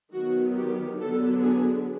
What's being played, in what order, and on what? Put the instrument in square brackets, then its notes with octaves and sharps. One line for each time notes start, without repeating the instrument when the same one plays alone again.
[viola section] D#3 F#3 B3 F#4
G4
D3 F#3 B3 D4 A4
G#4